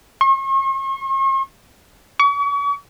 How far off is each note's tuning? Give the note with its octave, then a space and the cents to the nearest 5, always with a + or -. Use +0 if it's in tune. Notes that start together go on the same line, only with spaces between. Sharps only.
C#6 -45
C#6 +40